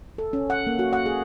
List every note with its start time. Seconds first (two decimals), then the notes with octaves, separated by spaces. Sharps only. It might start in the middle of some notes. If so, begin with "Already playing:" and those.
0.18 A4
0.33 C#4
0.50 F#5
0.67 A#3
0.79 F#4
0.93 F#5
1.06 G#4